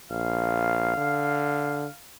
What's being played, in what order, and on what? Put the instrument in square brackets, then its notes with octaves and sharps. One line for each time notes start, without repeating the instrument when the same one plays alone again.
[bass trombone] A#1 [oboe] F5
[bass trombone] D3